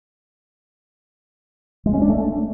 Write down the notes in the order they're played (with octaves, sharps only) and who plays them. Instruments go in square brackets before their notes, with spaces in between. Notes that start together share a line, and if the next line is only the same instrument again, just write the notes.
[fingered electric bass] G#3
C#4
D4
A3